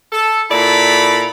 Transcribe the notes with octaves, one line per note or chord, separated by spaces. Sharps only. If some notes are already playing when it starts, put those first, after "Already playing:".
A4
A#2 E4 A4 D5 A#5 B5